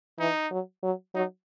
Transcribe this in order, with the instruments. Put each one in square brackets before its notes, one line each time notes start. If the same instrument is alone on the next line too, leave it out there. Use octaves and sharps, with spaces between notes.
[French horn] E3 [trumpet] D#4
[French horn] F#3
F#3
[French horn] F#3 [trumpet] D#4